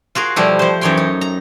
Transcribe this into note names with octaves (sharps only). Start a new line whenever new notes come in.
F4 F#4 G#4 A#4
B2 F3 G3 A3 E4
F3 C5
F#2 E3 D#4 C#5 G5 C6
D#4
A#5